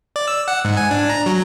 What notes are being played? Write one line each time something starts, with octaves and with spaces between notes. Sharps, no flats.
D5
E6
F#5
G#2
G#5
D4
A#5
F#3